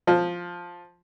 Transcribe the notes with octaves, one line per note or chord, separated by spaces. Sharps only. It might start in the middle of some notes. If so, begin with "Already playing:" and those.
F3